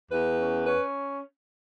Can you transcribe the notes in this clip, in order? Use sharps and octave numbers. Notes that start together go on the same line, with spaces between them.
E2 B4
C#4
C#4 B4